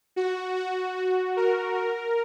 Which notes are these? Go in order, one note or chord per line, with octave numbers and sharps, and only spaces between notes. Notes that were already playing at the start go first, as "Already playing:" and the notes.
F#4
F#4
F#4
A#4
A#4